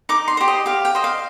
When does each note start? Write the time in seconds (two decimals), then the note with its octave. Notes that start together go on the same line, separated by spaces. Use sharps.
0.09 D#4 D6
0.28 C6
0.37 G4 C5
0.48 D#5
0.66 G4 F5
0.85 G5
0.95 C5 D#5
1.04 F5